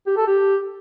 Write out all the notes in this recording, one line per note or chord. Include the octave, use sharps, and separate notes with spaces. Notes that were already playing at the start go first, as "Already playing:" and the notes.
G4
A4
G4